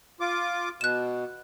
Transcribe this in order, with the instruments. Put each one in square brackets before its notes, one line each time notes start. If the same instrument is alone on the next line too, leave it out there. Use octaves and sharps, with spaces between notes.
[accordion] F4 D6
[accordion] B2 [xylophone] F#6 E7